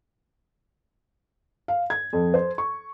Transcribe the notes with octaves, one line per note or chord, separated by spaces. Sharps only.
F5
G#6
F2
C5
C#6